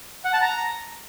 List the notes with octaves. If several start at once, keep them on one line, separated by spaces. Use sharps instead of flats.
F#5
A5
A#5